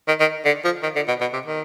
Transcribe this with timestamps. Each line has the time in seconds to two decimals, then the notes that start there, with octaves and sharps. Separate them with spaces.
0.08 D#3
0.20 D#3
0.45 D3
0.64 F3
0.83 D#3
0.96 D3
1.08 B2
1.21 B2
1.33 C3
1.46 D#3